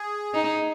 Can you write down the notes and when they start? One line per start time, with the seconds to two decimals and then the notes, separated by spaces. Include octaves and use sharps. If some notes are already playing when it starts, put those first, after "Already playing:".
Already playing: G#4
0.34 D#4